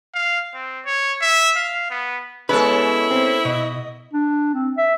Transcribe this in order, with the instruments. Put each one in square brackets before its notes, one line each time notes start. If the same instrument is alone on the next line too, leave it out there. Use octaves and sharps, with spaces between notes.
[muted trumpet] F5
C4
C#5
E5
F5
B3
[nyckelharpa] G#3 B3 [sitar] C#4 A4 [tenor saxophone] E4 [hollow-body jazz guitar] B4
[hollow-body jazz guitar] C4
[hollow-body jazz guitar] B2 [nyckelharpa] D#5
[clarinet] D4
C4
E5